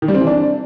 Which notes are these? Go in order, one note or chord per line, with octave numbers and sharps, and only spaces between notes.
D#3
G3
C4
E3
D4